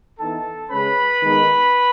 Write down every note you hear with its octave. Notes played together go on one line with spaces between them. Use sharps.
E3 B3 D#4 A4 A5
C#3 G#3 C#4 B4 B5
D#3 G#3 B3 D#4